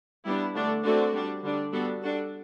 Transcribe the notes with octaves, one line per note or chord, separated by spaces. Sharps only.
G3 B3 D4 E4
D3 A3 D4
D3 A3 C4 D4 F#4
G3 D4
D3 G3 D4
G3 B3 D4 F#4 A4
G3 D4 F#4 A4